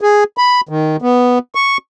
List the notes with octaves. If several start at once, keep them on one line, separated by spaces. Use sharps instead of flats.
G#4
B5
D#3
B3
C#6